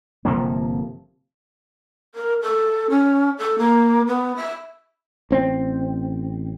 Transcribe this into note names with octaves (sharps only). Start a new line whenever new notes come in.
G1 C3 F3 A#3
A#4
A4
C#4
A4
A#3
B3
E5
A1 C4